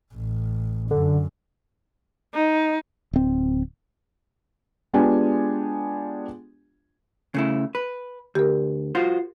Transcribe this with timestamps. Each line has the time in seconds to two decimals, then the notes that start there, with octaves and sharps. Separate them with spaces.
0.15 A1
0.91 F#2 D3
2.35 D#4
3.13 D1 C4
4.93 G#3 B3 D4 F4 G4 G#5
7.34 C#3 A3 E4
7.75 B4
8.35 D2 G4 A#4
8.95 F4 F#4 C5